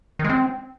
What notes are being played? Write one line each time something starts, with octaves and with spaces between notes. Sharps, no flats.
D#3
G#3
C4